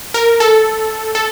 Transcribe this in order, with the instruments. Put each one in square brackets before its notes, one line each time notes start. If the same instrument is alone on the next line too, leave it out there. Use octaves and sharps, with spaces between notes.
[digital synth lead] A#4
A4
A4